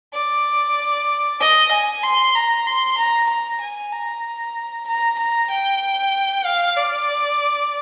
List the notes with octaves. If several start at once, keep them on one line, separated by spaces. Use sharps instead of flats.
D5
D#5
G#5
C6
A#5
C6
A#5
A#5
G#5
A#5
A#5
A#5
G5
F5
D5